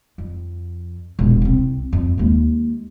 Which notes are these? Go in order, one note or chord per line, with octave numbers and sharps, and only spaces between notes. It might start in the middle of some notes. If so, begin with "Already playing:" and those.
F2
E1 A#1
C2 C4
F2
D#2 G#3